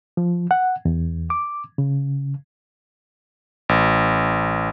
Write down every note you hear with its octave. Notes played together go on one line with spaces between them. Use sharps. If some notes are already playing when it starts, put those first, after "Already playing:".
F3
F#5
E2
D6
C#3
A1